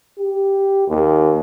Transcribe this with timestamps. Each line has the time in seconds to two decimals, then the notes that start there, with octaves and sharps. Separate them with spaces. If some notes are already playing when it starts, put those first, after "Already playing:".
0.19 G4
0.88 D#2